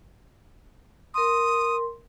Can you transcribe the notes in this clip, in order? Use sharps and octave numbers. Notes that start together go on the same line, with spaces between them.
A#4 C6 D#6